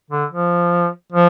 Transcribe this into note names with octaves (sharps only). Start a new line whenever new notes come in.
D3
F3
F3